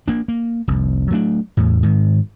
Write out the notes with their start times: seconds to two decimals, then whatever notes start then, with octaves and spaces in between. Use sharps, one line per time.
0.08 A#3 D4
0.28 A#3
0.68 F1 C2
1.11 F#3 A3 B3 D4
1.57 E2 A2
1.83 G#2 D#3